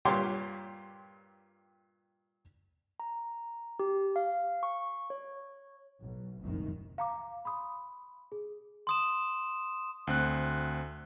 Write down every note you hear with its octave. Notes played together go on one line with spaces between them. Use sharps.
G2 A#2 G4 C#5 C6 D6
A#5
G4
F5
C#6
C#5
B1
F1 C2 F#2 A#2 D#3
F5 A#5 D6
B5 C6 D#6
G#4
C6 D#6 E7
D2 C4 F#6